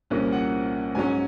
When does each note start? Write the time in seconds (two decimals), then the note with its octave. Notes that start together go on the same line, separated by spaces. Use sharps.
0.10 C2 A#2 F3 A#3 C#4
0.32 F#5
0.95 G#2 F#3 C#4 G#5